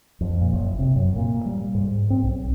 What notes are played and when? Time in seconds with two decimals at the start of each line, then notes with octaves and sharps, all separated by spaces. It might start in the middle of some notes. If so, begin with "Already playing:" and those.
0.21 F2
0.41 A#2
0.53 F#1
0.79 C3
0.96 F#2
1.16 A#2
1.46 G3
1.74 G#2
2.10 C4
2.23 B1